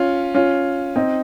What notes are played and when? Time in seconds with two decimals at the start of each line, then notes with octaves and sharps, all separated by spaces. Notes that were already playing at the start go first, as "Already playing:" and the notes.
Already playing: C#4 F4
0.35 C#4 F4
0.96 C4 D#4